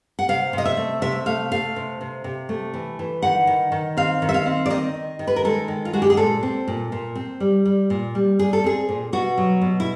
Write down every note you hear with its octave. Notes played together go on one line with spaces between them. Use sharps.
F#5
C3 F5
C3 D#5
E5
A3
C3 E5
A3 F5
A3 F5
C3
C3
C3
A3
E3
E3
D#3 F#5
D#3
D#3
C4 F5
D#3
E5
F5
C4
D5
D#3 D#5
D#3
D#3
B4
A#4
G#3 A4
D#3
F4
G#3 F#4
G4
G#4
A#2 A4
C4
A#2
A#2
C4
G3
G3
A#2
G3
G3 G#4
A4
C4 G#4
A#2
B2 F#4
F#3
B2
E4